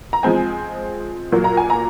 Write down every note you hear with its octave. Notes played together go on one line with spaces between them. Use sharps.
A#5
F3 G#3 C4 G#5
A#2 F#3 A#3
A#5
G#5
A#5